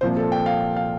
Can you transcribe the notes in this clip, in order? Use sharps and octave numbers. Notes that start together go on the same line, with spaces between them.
C2 A#2 F3 C5
A4
G5
F5
F5